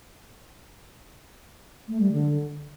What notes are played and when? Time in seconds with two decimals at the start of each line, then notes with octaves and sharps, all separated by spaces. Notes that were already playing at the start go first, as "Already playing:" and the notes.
1.88 A3
2.00 G3
2.12 D3